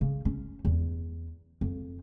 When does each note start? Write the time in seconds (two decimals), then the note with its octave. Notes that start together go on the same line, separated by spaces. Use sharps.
0.01 C#3
0.25 C#4
0.65 E2
1.61 F2